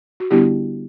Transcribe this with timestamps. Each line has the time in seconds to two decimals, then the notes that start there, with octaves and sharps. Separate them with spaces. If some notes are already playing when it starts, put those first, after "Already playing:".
0.20 F#4
0.30 D3 G3 B3 D4 E4 G4